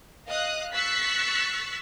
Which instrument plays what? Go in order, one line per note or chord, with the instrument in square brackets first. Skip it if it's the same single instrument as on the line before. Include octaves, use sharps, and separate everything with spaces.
[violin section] D#5 F5 D#6 F#6
C#6 E6 F#6 A6 B6 C7